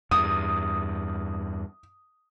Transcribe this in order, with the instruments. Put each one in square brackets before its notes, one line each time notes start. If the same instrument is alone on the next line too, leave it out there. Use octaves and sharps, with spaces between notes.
[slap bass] E2 G2 [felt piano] D#6